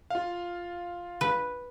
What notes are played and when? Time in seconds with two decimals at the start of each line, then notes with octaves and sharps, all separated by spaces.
0.10 F4 F5
1.21 B4